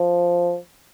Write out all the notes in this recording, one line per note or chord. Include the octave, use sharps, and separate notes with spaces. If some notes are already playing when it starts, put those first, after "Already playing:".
Already playing: F3